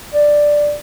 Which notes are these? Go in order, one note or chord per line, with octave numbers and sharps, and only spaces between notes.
D5